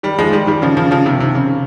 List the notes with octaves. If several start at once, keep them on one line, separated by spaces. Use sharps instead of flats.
D#3 G3
F3 G#3
D#3 G3
D#3 G3
C#3 F3
C#3 F3
C#3 F3
C3 D#3
C3
C#3